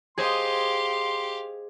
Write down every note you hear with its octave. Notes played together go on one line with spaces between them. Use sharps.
G4 G#4 C5 D#5 F5 C6